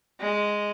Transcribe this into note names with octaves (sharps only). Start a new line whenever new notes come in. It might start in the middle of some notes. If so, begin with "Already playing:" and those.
G#3